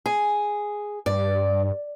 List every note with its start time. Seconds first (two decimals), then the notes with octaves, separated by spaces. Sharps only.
0.06 G#4
1.06 G2 D5